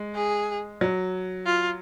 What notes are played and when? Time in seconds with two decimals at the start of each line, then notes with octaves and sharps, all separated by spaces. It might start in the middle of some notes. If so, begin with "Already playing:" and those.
Already playing: G#3
0.15 G#4
0.81 F#3
1.46 F4